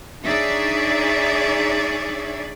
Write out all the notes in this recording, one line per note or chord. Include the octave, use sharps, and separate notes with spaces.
D4 D#4 G#4 C#5 D5 E5